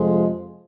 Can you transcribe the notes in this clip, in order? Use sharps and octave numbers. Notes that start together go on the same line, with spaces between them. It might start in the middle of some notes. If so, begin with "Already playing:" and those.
Already playing: F2 C3 F3 G#3